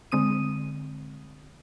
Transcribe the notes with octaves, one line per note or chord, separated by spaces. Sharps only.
D3 G#3 C4 D#6 D#7